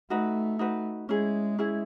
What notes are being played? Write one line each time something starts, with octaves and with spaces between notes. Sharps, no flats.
A3 D#4 F#4 B4
D#4 F#4 B4
G#3 C#4 E4 G#4
C#4 E4 G#4